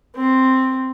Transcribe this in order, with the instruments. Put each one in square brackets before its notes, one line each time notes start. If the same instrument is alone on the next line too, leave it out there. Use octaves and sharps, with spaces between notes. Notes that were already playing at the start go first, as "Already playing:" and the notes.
[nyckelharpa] C4